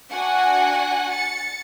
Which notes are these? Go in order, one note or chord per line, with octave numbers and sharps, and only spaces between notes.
D4 F#4 F#5 G#5
A6 C#7